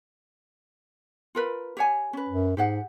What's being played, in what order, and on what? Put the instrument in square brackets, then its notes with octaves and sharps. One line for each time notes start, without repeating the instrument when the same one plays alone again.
[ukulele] F4 A#4 B4
G4 C#5 G#5
C#4 B4
[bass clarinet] F#2
[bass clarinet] G#2 [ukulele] G4 G#4 F#5